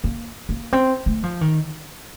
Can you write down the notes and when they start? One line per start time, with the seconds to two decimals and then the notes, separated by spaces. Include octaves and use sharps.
0.04 A#3
0.49 A#3
0.73 C4
1.06 A3
1.23 F3
1.41 D#3